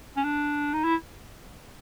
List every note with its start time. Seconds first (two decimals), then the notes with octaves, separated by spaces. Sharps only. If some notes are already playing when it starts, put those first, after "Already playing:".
0.16 C#4
0.24 D4
0.73 D#4
0.84 E4